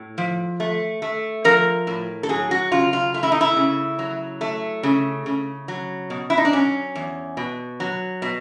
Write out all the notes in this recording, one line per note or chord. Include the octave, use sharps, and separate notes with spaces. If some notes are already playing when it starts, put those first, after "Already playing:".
Already playing: A2
F3
A3
A3
F3 A#4
A2
A4
F#3 G#4
F#4
C#3 F4
F4
A3 F4
E4
D#4
E4
C#3
F#3
A3
C#3
C#3
F#3
B2
E4
D#4
D4
F#3 C#4
E2
B2
F#3
B2